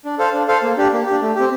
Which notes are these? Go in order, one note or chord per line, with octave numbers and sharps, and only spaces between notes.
D4
A4 C5 F5
D4
A4 C5 F5
A#3
D4 G4
A#3
D4 G4
A3
C4 G4